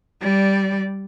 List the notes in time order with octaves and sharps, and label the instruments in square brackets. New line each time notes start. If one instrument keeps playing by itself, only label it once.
[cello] G3 D5